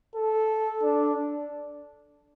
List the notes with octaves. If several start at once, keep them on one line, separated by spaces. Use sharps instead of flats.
A4
D4